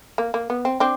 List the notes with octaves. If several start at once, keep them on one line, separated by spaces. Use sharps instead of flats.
A#3
A#3
B3
C4
C4 D4